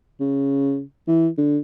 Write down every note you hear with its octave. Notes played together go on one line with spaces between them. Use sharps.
C#3
E3
D3